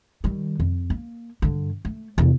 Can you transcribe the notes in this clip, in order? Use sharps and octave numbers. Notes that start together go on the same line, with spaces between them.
D#3 G3
F2
A#3
G2 D3
A3
E2 C3